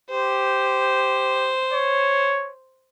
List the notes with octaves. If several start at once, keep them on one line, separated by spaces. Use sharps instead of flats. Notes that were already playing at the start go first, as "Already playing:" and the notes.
G4 C5
C#5